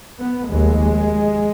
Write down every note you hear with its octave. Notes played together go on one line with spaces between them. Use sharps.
B3
F1 D#2 G#3